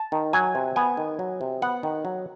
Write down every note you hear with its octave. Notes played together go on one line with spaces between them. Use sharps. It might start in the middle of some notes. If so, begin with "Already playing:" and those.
Already playing: A5
D#3
F#3 G#5
C3
B3 G#5
D#3
F#3
C3
B3 F#5
D#3
F#3